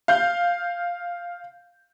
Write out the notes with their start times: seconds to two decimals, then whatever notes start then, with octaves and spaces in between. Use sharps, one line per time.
0.08 F5 G6